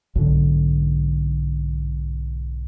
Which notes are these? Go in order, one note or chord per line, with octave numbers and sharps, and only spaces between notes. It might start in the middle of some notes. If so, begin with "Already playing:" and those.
B1 G#2 D3